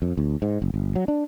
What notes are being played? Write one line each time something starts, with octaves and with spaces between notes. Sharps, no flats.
F2
D2
G#2
F#1
G1
F#3
D4